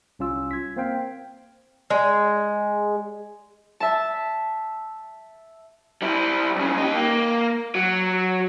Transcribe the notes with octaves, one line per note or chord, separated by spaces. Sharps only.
C2 C#4 F4 E6
G#6 B6
A#3 C4 C5 F5 G5
G#3
E5 A5
G3 E4
B1 C#3
D#4 G4
A#3
F#3